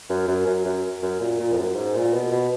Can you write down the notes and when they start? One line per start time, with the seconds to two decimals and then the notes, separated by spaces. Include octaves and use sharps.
0.10 F#2
0.28 F#2
0.47 F#2
0.65 F#2
1.02 F#2
1.20 A#2
1.39 A#2
1.52 F2
1.57 F#2
1.76 G#2
1.95 A#2
2.14 B2
2.31 B2